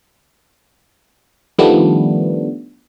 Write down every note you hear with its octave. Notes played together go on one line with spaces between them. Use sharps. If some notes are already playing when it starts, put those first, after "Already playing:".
D#3 F3 G3 A3 B3 D4